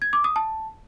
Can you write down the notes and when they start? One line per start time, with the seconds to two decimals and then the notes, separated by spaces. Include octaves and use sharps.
0.02 G#6
0.13 D6
0.24 D#6
0.36 A5